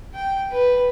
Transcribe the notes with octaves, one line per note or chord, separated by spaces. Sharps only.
G5
B4